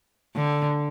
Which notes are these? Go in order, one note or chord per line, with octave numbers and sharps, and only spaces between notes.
D3